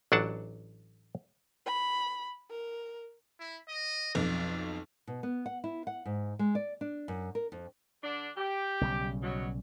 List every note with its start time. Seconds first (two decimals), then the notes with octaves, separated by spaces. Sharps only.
0.12 A1 F#3 D4 F#5 A5
1.66 B5
2.50 A#4
3.39 E4
3.69 D#5
4.15 B1 F2 D4
5.07 B2
5.23 B3
5.46 F#5
5.64 E4
5.87 F#5
6.05 G#2
6.39 G#3
6.55 D5
6.81 D4
7.08 F#2
7.35 A#4
7.52 F2
8.03 D3 D4
8.36 G4
8.81 B1 C#3 G3
9.23 B2 F#3 C#5